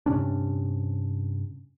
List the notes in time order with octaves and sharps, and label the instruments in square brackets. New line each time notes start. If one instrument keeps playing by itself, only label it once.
[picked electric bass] G2 C3 C#4 D4